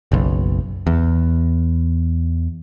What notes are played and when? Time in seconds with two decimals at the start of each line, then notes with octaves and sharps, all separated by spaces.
0.12 F#1 B1
0.87 E2